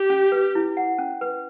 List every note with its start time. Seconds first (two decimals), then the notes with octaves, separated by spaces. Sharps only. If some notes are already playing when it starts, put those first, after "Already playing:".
Already playing: G4
0.10 C#4
0.32 B4
0.55 E4
0.77 F#5
0.99 C#4
1.21 B4